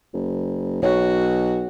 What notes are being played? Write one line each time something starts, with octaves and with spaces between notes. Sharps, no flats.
F#1
B1 F#4 C#5